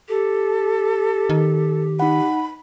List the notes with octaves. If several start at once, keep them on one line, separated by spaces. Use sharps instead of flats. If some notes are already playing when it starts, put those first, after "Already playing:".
G4 A4
D#3
D#4 F#5 B5